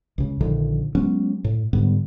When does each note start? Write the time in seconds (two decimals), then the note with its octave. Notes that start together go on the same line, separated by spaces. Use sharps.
0.18 C#2 C#3
0.41 A#1 D3 D#3 F3
0.95 F#3 G#3 B3 C#4
1.44 A2
1.73 G#2 D3 G3 B3